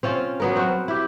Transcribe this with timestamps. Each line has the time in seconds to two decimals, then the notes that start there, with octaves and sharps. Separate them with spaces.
0.03 C4 C#4 F4
0.40 F#3 B3 A#4
0.56 C4 F#4
0.88 E4 G4